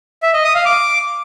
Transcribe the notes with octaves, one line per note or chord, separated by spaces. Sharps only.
E5
D#5
D#6
F5
D6